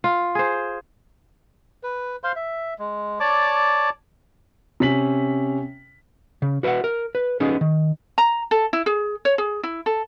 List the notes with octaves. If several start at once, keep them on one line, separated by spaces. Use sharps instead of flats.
F4
G#4 C5
B4
C5 F5 C6
E5
G#3
C#5 D5 A5 D6
C3 C#4 B6 F#7
C#3
F#4 B4 D#5 E5 F#5
A#4
B4
B3 C#4 D#4 G#4
D#3
A#5
A4
E4
G#4
C#5
G#4
E4
A4